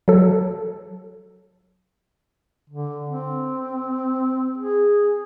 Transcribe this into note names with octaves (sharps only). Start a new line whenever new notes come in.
F#3 A4
D3
C4
G#4